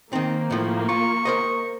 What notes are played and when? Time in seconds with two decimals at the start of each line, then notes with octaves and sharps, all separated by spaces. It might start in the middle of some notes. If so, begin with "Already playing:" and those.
0.13 D#3 A#3 C4 D#4
0.51 A2 F3 A3
0.89 F4 C#6
1.25 A#4 C5 D#5